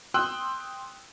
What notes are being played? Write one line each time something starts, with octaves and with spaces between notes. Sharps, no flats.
G5 C6 D#6 E6 F#6